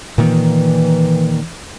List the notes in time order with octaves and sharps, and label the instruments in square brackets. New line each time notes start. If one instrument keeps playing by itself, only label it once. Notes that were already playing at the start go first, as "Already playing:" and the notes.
[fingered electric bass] A#2 D#3 A#3 [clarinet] E3